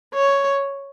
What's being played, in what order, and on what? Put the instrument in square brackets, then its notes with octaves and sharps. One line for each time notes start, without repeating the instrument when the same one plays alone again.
[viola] C#5